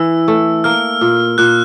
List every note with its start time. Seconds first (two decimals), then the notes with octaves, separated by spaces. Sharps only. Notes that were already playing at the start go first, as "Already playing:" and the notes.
Already playing: E3 E6
0.28 A3
0.64 A#3 F6
1.01 A#2
1.38 A#2 F#6